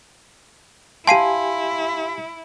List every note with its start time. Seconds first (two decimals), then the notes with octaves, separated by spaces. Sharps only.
1.07 E4 G4 F5 G#5 A5 C6 C7 D#7